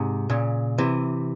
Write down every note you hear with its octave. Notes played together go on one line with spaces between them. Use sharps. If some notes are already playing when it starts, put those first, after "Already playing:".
Already playing: G#2 C3
A#2 C#3
C3 E3